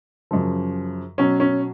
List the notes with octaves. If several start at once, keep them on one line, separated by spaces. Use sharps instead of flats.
F#2 C#3 F3
B2 F#3 C#4
C#4